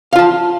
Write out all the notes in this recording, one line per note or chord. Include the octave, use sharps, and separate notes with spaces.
F4 F5 A5